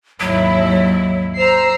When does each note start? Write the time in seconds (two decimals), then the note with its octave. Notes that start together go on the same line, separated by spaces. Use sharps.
0.20 G#1 D#2 F#3 E4
1.38 C5 A#5 E6 C7